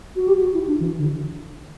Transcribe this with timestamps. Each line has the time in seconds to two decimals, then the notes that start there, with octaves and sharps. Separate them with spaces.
0.16 F#4
0.28 G4
0.40 F#4
0.54 E4
0.67 D4
0.80 E3
0.98 D3